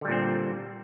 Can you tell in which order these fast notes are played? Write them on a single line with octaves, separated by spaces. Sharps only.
D3 G3 A#2 C4